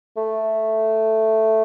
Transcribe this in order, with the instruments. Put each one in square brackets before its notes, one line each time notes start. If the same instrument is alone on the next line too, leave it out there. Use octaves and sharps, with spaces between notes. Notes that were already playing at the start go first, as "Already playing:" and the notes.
[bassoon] A3